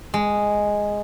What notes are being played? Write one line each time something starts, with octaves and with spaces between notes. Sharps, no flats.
G#3